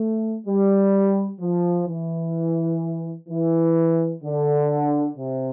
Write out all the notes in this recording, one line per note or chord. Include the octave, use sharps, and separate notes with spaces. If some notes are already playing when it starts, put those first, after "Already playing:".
Already playing: A3
G3
F3
E3
E3
D3
C3